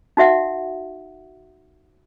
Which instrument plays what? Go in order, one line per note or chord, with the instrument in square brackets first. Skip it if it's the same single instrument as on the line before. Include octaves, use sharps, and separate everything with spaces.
[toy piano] D#4 F#4 E5 F#5